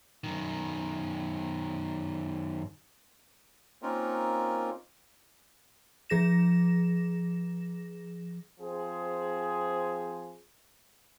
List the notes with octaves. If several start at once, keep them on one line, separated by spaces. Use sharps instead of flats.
F#2 D#3
A#3 C4 C#4 D#4 F4 A#4
F3 G#4 A#6 E7
F3 C4 G#4